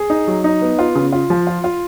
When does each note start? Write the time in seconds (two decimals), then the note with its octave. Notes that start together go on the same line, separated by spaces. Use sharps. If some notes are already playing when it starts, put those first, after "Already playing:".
Already playing: G#4
0.10 D#4
0.27 F#3
0.44 D#4
0.62 B3
0.79 F4
0.95 C#3
1.12 F4
1.30 F3
1.47 F4
1.64 F4